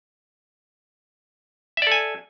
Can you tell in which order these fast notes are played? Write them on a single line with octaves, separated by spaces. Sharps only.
E5 D5 A4 G#5